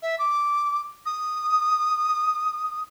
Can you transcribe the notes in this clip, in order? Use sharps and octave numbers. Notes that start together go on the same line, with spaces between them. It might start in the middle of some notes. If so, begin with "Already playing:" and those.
E5
D6
D#6